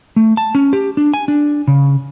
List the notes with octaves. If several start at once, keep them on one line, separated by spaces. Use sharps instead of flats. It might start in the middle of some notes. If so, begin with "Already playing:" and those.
A3
A5
C#4
G4
D4
G#5
D4
C#3